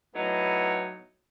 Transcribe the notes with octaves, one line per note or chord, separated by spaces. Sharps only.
A2 F#3 B3 D#4